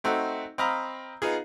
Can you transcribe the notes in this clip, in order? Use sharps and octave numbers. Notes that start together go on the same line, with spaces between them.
A3 C4 D#4 F#4
C4 D#5 F5 A#5 B5
B3 D#4 F4 G#4